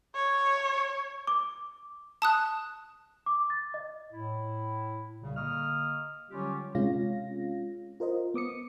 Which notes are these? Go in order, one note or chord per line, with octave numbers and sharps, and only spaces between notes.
C#5
D6
A5 D#6 F#6
D6
A6
D#5
A2 E4
C2 A#2 C#3
D3 A#3 D#5 C#6 F6
D3 F#3 G3 C#4 F4 G4
C3 G#3 C#4 F4 F5 A#6
F4 A#4 C5 D#5
B3 D6 D#6 C#7